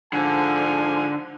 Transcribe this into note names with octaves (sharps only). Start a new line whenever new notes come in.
G#2 D3 F3 G#5